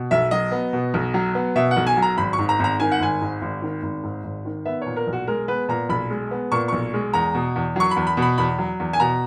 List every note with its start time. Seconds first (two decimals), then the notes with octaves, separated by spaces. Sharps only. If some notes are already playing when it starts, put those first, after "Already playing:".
Already playing: B2
0.11 B1 E5
0.31 F#3 D#5
0.52 B3
0.73 B2
0.94 B1
1.14 F#3
1.35 B3
1.56 B2 E5
1.71 F#5
1.77 B1
1.87 G#5
1.97 F#3
2.02 A#5
2.17 G#1 B5
2.33 C#6
2.39 G#2
2.49 A#5
2.59 G#1 A#5
2.80 D#3 G#5
2.92 F#5
3.00 G#1 G#5
3.21 G#2
3.42 G#1
3.62 D#3
3.83 G#1
4.03 G#2
4.24 G#1
4.45 D#3
4.65 B3 E5
4.82 A#2 C#5
4.96 A#4
5.07 B1
5.13 F#4
5.27 G#3 A#4
5.48 B3 B4
5.69 A#2 A#5
5.89 B1 B5
6.10 G#3
6.31 B3
6.52 A#2 C#6
6.68 B1 C#6
6.94 G#3
7.14 E2 A#5
7.35 B2
7.56 E2
7.76 F#3 C#6
7.91 B5
7.96 E2
8.07 B5
8.17 B2 B5
8.38 E2 B5
8.58 F#3
8.80 E2
8.93 G#5
9.00 B2 A#5